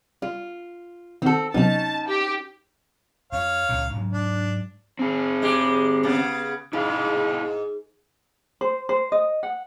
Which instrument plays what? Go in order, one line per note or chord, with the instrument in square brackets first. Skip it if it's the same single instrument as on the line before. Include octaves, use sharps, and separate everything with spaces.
[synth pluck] G3 [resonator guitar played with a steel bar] F4
[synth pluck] D#3 F#4 [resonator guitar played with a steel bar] C4 A4
[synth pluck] C3 F#3 B3 [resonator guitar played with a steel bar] C#4 D#4 [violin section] A5
[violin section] G4
[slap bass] F2 [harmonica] C#5 F5
[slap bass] C#2 A#2
G#2 F#3
[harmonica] D4
[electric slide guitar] C4 G#4
[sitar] G#3 G4
C#3 B3
[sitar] G#2 [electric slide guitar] E4 G#4 F5
[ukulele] C5
C5
D#5
F#5